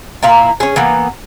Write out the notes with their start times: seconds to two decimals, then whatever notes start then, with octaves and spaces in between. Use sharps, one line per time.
0.23 A#2 E4 F5 A#5
0.60 C#4 G#4
0.76 E3 A#3 B3